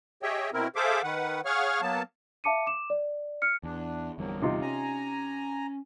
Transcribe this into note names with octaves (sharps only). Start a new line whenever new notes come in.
G4 G#4 C#5 D#5 E5 G5
B2 C4 E4 A#4
G#4 A4 C5 E5 F5 D6
D#3 B4 F#5
G#4 C#5 F5 F#5 C#6 F6
F#3 A#3 B3 A5
E5 F5 A5 D6 C#7 D#7
D6 E7
D5
F6 C#7
E2 D4
G1 E2 G2 F3 F#3 A#3
C3 D#4 F4
C#4 G#5 A#5